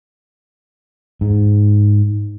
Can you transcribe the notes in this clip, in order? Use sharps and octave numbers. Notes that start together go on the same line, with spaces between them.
G#2